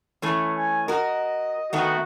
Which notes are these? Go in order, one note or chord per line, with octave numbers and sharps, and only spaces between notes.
E3 A3 C#4
G#5
F#4 A#4 D#5
D#3 A3 B3 F#4